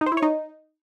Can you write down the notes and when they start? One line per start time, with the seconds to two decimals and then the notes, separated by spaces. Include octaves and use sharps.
0.01 D#4
0.06 C5
0.12 E4
0.17 C#5
0.22 D#4